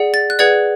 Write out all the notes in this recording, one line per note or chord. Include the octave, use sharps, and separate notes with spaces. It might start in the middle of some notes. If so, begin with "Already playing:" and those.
Already playing: G#4 D5 F#5
A6
F#6
G#4 B4 D5 F#5 G#6